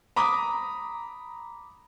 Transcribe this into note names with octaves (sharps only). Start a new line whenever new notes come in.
A#5 B5 D6 D#6